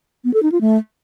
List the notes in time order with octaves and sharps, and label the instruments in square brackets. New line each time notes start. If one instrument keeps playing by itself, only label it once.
[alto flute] B3
A4
D#4
F4
A3